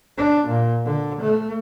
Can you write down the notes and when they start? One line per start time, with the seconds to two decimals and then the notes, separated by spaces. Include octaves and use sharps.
0.18 D4
0.48 A#2
0.86 D3
1.22 A3